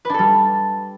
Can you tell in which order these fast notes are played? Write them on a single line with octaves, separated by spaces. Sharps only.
B4 D4 A4 G3